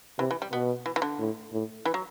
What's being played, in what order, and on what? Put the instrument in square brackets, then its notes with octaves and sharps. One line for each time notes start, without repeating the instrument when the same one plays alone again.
[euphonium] C3 [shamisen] E3
[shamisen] E3
G3
[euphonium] B2 [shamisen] B3
[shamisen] E3
E3
D3
[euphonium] A2
A2
[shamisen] E3
F#3